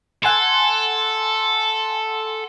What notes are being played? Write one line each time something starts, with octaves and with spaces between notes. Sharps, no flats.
A4 F#5 G#5 C6